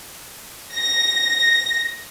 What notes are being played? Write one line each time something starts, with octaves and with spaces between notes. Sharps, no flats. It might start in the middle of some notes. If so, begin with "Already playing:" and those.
A#6